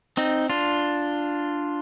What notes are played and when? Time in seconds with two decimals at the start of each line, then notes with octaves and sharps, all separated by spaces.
0.17 C4 D#4
0.50 D4 F4